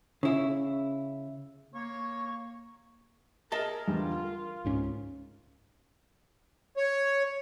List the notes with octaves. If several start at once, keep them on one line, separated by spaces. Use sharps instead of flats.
C#3 E4
A#3 C#5
G#4 A#4 D#5 E5 A5
E2 D3 G3 F4
A#4
C#2 G#2 C#4
C#5